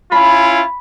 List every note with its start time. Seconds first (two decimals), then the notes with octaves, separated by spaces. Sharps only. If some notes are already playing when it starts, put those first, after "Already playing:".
0.12 C#4 E4 F4 B5